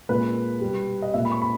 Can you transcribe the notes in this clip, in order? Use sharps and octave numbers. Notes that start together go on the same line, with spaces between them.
A#2 G#3 B4
B2 G3
D#5
A#2 G#3 E5
B5
C#6
B5